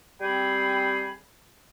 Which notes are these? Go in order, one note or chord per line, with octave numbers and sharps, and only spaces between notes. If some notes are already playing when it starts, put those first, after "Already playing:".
G3 C4 G#4 G5 B5